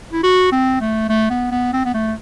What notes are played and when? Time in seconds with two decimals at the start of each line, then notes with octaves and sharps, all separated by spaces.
0.13 E4
0.23 F#4
0.52 C4
0.81 A3
1.09 A3
1.30 B3
1.51 B3
1.73 C4
1.85 B3
1.94 A3